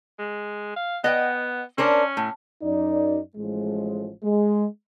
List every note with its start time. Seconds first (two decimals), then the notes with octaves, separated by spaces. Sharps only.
0.19 G#3
0.76 F5
1.04 B3 D#5 F#5 G5
1.78 C#4 D4 A#4 C5
2.17 A2
2.62 F#2 D#4 D5
3.36 A1 A2 F3 G#3
4.23 G#3